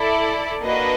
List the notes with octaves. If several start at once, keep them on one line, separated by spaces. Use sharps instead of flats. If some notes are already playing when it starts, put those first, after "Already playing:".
Already playing: E4 A4 D5
A#3 D4 F#4 B4 D#5